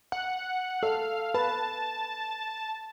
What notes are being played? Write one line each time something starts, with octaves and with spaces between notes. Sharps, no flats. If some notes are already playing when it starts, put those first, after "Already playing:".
F#5
A4 F5
B4 A5